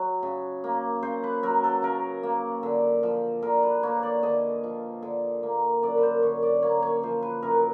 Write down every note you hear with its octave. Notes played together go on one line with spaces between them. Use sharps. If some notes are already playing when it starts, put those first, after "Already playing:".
Already playing: F#3 C#5
C#3
A#3
C#3 C5
B4
F#3 A#4
A4
C#3 A#4
A#3
D3
F3
D3 A#4
B4
A#3 C#5
D5
D3 D#5
F3
D3
A#3
F#2 D5
B4
C5
D3 C#5
D5
A#3 C#5
C#5
F3 C5
B4
F#2 A#4